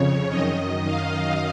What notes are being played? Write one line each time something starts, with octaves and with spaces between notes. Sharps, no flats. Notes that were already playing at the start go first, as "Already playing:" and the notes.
Already playing: F2 C#3 C#5
F#2 D#3 D#5
F5